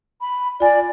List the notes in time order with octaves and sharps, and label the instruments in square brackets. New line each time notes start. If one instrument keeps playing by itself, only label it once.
[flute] B5
[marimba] F4 G#5 [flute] D5